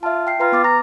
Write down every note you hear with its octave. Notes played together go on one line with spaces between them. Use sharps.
F4 E5 A5
G5 F6 C7
F4 B4 A#5
B3 D6 A6
A#5 F6